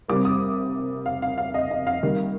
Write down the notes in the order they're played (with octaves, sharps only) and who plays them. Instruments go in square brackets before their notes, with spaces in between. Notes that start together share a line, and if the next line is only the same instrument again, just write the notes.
[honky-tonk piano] C3 G3 A#3 D6
D#6
F5
F5
F5
D#5
D#5
F5
D#3 G3 A#3